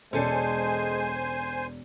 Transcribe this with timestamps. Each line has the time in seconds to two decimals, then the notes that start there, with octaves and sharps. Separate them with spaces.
0.13 E1 G#3 C#4 A4 C5 D5 G#5